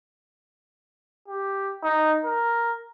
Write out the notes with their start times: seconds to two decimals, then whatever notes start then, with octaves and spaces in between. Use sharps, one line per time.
1.28 G4
1.83 D#4
2.25 A#4